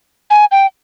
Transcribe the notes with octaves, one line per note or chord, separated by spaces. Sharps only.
G#5
G5